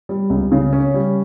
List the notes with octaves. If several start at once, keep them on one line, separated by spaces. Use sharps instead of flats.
G3
C#2
C#3
C#4
G3